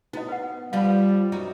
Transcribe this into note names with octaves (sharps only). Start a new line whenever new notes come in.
B3 D#4 E4 D#5
B4 F#5
F3 G3 F4 B4 F5
F#2 D#4 F#4